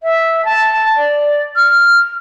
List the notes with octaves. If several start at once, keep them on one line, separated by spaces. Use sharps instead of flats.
E5
A5
D5
F6